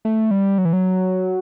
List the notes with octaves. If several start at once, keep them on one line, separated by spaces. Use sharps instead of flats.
A3
G3
F#3
E3
F#3